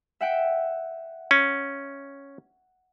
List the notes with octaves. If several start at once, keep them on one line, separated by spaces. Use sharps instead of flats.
E5 F#5 G5
C#4